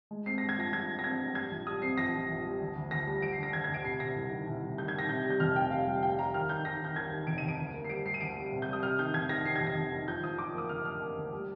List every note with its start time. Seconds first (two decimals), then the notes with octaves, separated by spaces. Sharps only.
0.11 G#3
0.26 C4 C7
0.38 G2 A#6
0.49 G#6
0.58 F3 A#6
0.73 F3 G#6
0.89 G2
0.99 A#6
1.04 C4 G#6
1.20 G2
1.35 G3 G#6
1.51 A#1
1.67 G3 D#6
1.82 C4 C7
1.98 A#1 A#6
2.14 A#1
2.29 A#1
2.45 G3
2.60 D2
2.76 D2
2.91 D2 A#6
3.07 G3
3.22 D2 D7
3.32 C7
3.38 D3 A#6
3.53 D2 G#6
3.64 D2 G#6
3.74 D7
3.84 C3 C7
4.00 C3 A#6
4.16 C2
4.32 D#3
4.47 C2
4.62 C2
4.78 D#3 G6
4.88 G#6
4.94 D#3 A#6
5.09 C3 G6
5.25 G3
5.30 G6
5.40 F1 F6
5.56 C3 G5
5.71 G3 F5
5.87 G3
6.03 G3 G5
6.18 G3 A#5
6.34 D#2 F6
6.49 D#3 G6
6.65 D#3 A#6
6.81 D#3 G6
6.96 D#2 G#6
7.12 D#3
7.27 F1 D7
7.38 F1 D#7
7.48 D7
7.59 D2
7.74 A#3
7.84 C7
7.89 G3 D7
8.05 G3 C7
8.14 D#7
8.21 D2 D7
8.36 G3
8.52 C3
8.62 G6
8.68 G3
8.73 D#6
8.83 C3 F6
8.99 D#3 G6
9.14 F1 G#6
9.29 D#3 A#6
9.45 D#3 C7
9.56 G#6
9.61 F1
9.67 A#6
9.77 F1
9.92 D#3
10.08 F3 G6
10.23 F3 D#6
10.38 F3 D6
10.54 A#3 D#6
10.69 D3 F6
10.85 A#3 F6
11.01 A#3
11.17 D2
11.33 G3